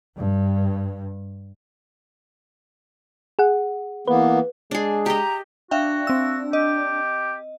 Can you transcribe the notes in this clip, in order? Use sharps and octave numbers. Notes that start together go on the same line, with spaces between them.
G2
G#4 F#5
E3 A#3 B3 B4
G#3 D4 G#4
G4 D#5 A#5
D4 F#4 E5 F5 G5
C4 E6
G4 D#5